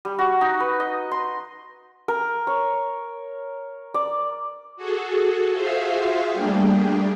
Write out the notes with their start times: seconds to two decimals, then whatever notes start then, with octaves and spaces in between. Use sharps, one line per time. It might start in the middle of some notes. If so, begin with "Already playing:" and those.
0.05 G3
0.19 F#4
0.41 D#4
0.60 B4
0.80 D#5
1.11 C6
2.08 A#4
2.47 C#5
3.94 D5
4.77 F#4 G#4 A4
5.51 F4 F#4 G#4 C5 E5 F5
6.32 G3 A3 A#3 D4 G4 G#4